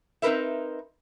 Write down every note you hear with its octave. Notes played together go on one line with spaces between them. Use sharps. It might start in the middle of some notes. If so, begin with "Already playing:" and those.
C4 D#4 F4 A#4 B4 E5